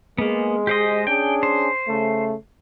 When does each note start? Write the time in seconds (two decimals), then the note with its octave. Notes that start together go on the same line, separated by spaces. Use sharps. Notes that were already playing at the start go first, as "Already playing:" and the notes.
0.18 G#3 A#3 B3
0.67 G4 C5 D#5
1.07 C#4 D4 G#4 G5
1.43 C5
1.88 C#3 A3